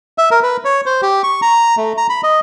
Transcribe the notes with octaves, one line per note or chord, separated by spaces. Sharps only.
E5
A#4
B4
C#5
C5
G4
C#6
A#5
A3
A#5
B5
D#5